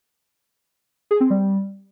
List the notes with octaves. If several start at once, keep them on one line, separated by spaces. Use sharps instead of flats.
G#4
C4
G3